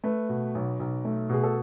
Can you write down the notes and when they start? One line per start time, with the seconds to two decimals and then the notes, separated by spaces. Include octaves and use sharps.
0.04 A3 B4
0.29 B2
0.55 B1
0.79 B1
1.05 A3
1.29 B2 G#4
1.44 A4